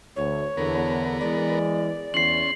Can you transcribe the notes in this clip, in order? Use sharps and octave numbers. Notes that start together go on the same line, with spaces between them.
D2 C#5
E2 D3 B3 A#4
E3 G#3 D5
E2 C#4 C6 C7 F#7